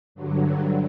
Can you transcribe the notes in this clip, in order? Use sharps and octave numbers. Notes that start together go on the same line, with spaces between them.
G2 D3 F#3